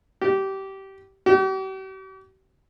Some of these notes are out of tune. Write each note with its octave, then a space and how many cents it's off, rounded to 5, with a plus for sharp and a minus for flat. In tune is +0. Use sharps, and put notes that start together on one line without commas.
G4 -20
G4 -45